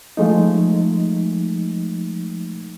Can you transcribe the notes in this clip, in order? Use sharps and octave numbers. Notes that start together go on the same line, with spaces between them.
F3 G#3 A3 D#4